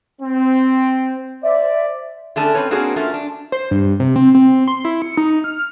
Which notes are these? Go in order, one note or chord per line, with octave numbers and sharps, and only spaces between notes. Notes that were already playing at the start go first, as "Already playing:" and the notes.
C4
C5 D5 E5
D3 A3 C#4 D4 G#4 A5
C4 C#4 B4 C#5
A#3 C4 D4 F#4 G#4 A#4
A3 C#4 F4 A#4
D4
C5
G2
C3
C4
C4
C6
E4
C#7
D#4
F6